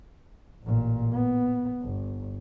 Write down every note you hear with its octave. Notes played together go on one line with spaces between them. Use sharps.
A1 A#2
B3
G1